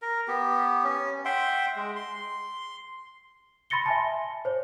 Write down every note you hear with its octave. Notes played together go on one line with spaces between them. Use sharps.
A#4
B3 G4
C#4
E5 F#5 G5 C6
G#3
C6
B5 C6 A6 A#6 C#7 G7
E5 G#5 A5
C5 C#5